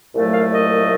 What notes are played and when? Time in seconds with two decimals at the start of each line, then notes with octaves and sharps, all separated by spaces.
0.14 C2 A#2 F#3 A3
0.33 F5
0.52 D#5